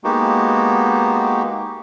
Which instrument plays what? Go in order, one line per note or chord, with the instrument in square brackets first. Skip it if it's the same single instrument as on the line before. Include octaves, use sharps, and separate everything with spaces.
[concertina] G#3 A#3 B3 D#4 F#4 G4